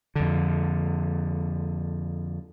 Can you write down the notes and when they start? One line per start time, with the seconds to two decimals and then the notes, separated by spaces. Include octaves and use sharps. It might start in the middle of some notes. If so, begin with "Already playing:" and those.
0.16 F2 D3